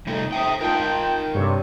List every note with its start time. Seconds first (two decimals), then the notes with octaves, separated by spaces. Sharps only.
0.07 C3 G3 A3 D#4
0.32 C5 E5 G5 D#6
0.61 D#4 F4 A#4 D#5 G5 A5
1.35 G2 C3 A4 C#5 C#6